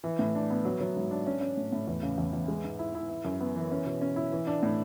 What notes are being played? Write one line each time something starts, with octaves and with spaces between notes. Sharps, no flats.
E3
A2
D4
B3
F#3
F#3
G#2
D4
C#4
C#4
A2
A2
E2
C#3
E2
E2
G#3
G#2
E4
E4
E4
F#2
B3
E3
C#4
B2
C#4
E4
E3
D4
A2